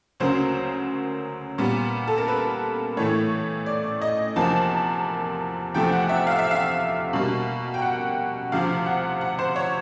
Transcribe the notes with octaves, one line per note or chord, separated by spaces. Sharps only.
D2 C#3 F#3 A#3 C5
A#2 G3 B3
A4
A#4
B4
A2 E3 A3 C#5
D5
D#5
E2 C3 F3 A#3 A5
E2 C3 F3 A3 G5
F#5
E5
F5
E5
F5
B2 G3 A#3
G5
F#5
D2 C3 F3 F5
F#5
F#5
C5
C#5